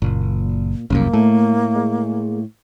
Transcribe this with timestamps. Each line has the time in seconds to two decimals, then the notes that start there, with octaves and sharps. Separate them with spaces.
0.02 F#1 A#2
0.90 F1 C2 F#2 C#3 A#3
1.13 A2 A3
1.76 G#3